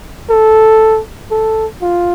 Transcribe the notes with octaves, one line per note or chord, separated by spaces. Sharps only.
A4
A4
F4